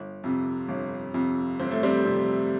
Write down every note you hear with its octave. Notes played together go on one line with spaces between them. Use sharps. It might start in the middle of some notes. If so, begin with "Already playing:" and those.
Already playing: G1
F2 C3
G1
F2 C3
G1 C4
A3
G3 C4
F2 C3